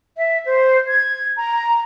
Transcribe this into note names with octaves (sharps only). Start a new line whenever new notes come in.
E5
C5
G#6
A#5